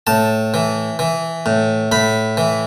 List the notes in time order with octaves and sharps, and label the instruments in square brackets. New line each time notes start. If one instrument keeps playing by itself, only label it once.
[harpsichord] A2 A5
E3
E3
A2
A2 B5
E3